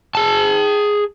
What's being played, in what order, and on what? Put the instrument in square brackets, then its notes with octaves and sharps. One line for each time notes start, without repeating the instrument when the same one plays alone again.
[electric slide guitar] G#4 A5